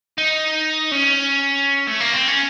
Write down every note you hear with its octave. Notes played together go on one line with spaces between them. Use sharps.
D#4
C#4
A3
A#3
C4
C#4